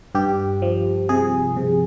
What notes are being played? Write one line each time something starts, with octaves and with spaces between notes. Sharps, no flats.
G2 G4
F3
C3 G#4
C3